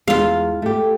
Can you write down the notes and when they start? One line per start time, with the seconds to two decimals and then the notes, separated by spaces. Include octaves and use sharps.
0.08 E2 G#3 F4 F5
0.62 A3 G4